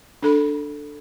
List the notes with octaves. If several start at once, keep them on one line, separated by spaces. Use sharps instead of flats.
D4 A4 B5